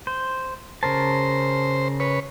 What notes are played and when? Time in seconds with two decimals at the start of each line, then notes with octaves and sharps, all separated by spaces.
0.07 C5
0.83 C#3 A#4 C5 A5
2.00 B4 C#5